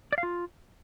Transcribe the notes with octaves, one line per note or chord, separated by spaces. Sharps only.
D5
F5
F4